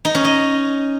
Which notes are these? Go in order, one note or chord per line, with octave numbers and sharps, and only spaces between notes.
D#4
C#4
D#5